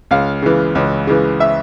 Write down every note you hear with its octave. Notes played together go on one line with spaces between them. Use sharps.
C#2 F5
C#3 E3
C#2
C#3 E3
E5